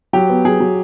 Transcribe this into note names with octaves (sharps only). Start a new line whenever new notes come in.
F#3 G4
B3
F#3 G#4
F#3